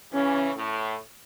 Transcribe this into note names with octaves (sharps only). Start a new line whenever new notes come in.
C#3 E3 C#4
A2